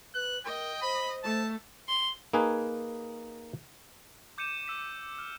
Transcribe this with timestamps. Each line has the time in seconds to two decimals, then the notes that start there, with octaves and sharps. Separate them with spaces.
0.15 B4 F#6
0.45 A#4 D#5 G5
0.82 C5 B5
1.24 A3 A5
1.88 C6
2.33 A#3 D#4 G#4 B4 G#5
4.38 D6 G6 C#7 D#7 E7
4.66 E6 B6 E7
5.18 F6